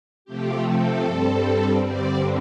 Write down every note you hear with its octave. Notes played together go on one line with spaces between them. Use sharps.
C3 F3 A3 C4 G4
A4
G2 G3 C4
G2 D3 G3 C4 D5